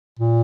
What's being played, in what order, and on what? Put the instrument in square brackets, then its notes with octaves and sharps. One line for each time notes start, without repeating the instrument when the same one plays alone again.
[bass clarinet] A#2